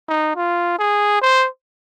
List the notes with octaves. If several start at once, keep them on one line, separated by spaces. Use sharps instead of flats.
D#4
F4
G#4
C5